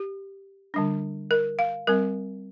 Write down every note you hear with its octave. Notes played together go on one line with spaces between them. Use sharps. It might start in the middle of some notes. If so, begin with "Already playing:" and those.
Already playing: G4
D3 G3 D4
A#4
F5
G3 C4 A#4